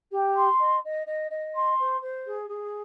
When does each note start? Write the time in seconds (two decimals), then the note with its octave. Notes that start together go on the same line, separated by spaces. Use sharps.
0.12 G4
0.35 C6
0.59 D#5
0.83 D#5
1.07 D#5
1.31 D#5
1.54 C6
1.78 C5
2.01 C5
2.26 G#4
2.49 G#4